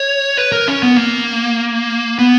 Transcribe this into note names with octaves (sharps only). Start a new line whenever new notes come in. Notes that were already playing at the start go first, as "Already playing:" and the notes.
Already playing: C#5
B4
A#4
C#4
B3
A#3
B3